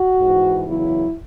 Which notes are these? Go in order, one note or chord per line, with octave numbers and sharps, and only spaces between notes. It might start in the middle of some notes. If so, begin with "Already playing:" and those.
Already playing: F#4
G#2 E3
E2 C#3 F#3 E4